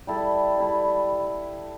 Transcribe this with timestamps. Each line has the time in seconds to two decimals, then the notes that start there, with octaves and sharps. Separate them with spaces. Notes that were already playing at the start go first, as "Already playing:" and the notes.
0.07 G3 E4 A4
0.58 G3 E4 A4